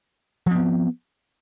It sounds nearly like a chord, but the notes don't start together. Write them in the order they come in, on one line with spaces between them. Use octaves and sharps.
F3 C4 B3